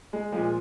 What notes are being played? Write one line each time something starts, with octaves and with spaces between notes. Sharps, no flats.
G#3
A#2 F3 G#3